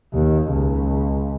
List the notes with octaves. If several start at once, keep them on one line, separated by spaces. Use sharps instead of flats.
D#2
C#2